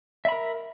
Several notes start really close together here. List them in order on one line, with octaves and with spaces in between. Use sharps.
E5 B5 A#4